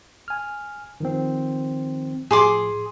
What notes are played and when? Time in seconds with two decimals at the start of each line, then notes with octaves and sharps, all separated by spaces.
0.28 G#5 F6
1.00 D#3 F3 C4
2.31 A2 F3 G#4 C6 D6